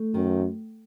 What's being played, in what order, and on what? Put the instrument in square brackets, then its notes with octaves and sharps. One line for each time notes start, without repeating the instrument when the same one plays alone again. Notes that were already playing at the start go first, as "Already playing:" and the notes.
Already playing: [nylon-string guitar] A3
[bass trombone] F#2 [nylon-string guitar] D#3